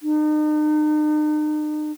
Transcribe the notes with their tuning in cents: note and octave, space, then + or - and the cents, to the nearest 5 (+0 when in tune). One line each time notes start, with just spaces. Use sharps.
D#4 -40